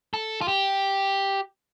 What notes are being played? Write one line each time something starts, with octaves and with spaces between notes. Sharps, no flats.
A4
F4
G4